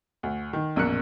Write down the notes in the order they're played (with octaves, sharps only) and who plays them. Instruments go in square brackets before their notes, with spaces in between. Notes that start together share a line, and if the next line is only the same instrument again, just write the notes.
[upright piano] D2
D#3
A#1 F#2 B2 A#4 F#6 C#7